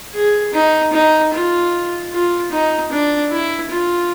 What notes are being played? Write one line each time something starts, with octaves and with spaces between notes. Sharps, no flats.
G#4
D#4
D#4
F4
F4
D#4
D4
E4
F4